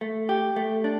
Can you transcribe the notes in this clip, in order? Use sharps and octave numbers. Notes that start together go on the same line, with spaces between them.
A3
G4
A3
D4